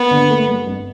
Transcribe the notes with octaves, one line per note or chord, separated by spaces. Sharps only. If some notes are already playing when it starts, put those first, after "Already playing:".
Already playing: B3
D3
A3
G2
G1